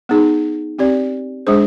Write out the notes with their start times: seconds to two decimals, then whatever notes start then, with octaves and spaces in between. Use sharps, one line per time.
0.09 B3 D#4 G#4
0.79 C4 G4 D5
1.47 G#3 D4 G#4 C5